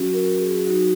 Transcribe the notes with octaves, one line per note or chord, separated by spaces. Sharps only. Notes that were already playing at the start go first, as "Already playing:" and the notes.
Already playing: F#3 C#4 F#4
A#4
G#4
F#3 D#4 F#4